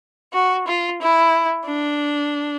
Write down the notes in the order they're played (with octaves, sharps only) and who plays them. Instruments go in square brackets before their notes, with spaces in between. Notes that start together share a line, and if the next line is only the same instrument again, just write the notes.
[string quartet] F#4
F4
E4
D4